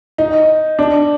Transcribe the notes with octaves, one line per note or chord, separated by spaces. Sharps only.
D#4
D4